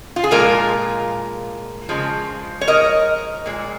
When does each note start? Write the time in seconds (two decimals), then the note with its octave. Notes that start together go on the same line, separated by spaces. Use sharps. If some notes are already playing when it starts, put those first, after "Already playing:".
0.16 F4
0.24 G#4
0.31 A#2 F3 G#3 F4 A#4
1.89 C#3 F3 G#3
2.61 C#5
2.68 A#4 D#5
3.46 A#2 G#3